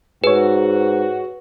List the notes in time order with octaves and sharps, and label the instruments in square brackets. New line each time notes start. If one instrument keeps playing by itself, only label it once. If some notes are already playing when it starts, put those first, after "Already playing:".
[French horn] G#2 [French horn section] F#4 [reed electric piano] G#4 C#5 [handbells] B4